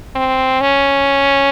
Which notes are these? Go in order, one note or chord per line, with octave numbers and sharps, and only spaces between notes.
C4
C#4